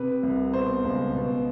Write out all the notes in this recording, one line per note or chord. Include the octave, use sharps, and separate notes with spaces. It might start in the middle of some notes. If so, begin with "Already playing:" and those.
Already playing: C3 B4
C2
B2 C5
C#2
B2